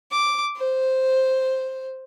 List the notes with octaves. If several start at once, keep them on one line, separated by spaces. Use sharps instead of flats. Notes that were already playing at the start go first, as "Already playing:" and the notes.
D6
C5